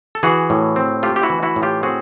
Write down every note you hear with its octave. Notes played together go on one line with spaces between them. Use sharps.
A4
E3 F#4 G#4
A2
C4
A3 F4 G4
G4
E4 F#4
E3
E4 F#4
A2
F4 G4
C4 F#4 G#4